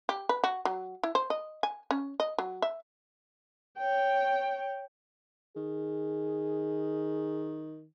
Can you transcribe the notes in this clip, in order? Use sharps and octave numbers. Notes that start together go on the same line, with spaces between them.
G4
B4
F#4
F#3
E4
C5
D#5
G#5
C#4
D#5
F#3
E5
C#5 G5
D#3 G#4